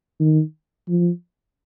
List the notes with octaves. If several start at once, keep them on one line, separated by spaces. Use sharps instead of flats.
D#3
F3